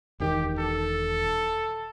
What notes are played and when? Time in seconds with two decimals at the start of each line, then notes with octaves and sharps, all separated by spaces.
0.20 E1 D#3 G4
0.58 A4